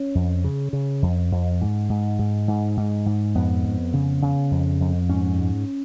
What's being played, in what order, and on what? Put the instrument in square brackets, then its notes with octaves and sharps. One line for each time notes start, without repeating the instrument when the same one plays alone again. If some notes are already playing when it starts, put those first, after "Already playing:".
Already playing: [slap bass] C#4
F2
C#3
C#3
F2
F2
G#2
G#2
G#2
G#2
G#2
G#2
F2 B3
F2
C#3
C#3
F2
F2
G#2 C#4
G#2